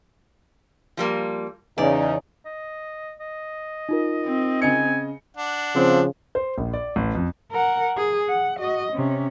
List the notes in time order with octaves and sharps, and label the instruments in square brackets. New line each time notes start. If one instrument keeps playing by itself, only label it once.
[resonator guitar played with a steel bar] F3 G3 A#3
[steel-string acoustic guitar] E2 [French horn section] C#3 D#4 [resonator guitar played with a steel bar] D5
[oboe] D#5
D#5
[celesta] D#4 F4 A#4
[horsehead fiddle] C4
[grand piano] C#3 D#5 C#7 [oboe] G#5
[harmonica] D4 F#5
[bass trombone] C#3 [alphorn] F3 [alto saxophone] C4
[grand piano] C5
A#1
D5
A1
F2
[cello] A#4 F#5
G#4
F#5
F#4 D#5
C3 C#4